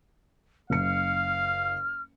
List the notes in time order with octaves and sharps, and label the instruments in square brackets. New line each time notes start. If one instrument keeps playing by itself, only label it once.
[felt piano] F#1 C#7 [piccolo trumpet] F5 [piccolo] F6